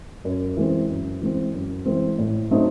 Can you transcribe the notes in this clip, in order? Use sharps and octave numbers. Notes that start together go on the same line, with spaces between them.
F#2
E3 G#3 C4
F#2
E3 G#3 C4
F#2
E3 G#3 C4
A2
F#3 A3 C4 D#4